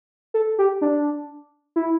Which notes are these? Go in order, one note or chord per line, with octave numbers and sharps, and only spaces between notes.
A4
G4
D4
E4